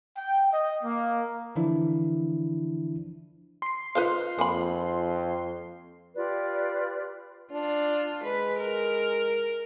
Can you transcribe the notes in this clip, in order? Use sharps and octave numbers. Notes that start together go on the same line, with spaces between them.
G5
D#5
A#3
D3 E3 F3 D4 E4
C6 C7
D#4 F4 B4 C5 F5
F2 A#3 G#5 B5
F4 G4 B4 D5
D4 F4
G#3 B4
A#4